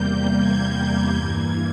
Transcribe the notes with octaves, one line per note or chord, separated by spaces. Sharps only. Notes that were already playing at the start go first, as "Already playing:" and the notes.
Already playing: E2 C3 G3 A#3 G6
G#6
G2 E3 A#3